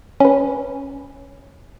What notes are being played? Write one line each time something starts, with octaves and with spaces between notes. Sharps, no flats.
C#4 B4